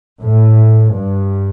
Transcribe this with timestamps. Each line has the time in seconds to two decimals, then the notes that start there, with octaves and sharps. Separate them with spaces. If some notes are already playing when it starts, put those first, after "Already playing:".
0.23 A2
0.95 G2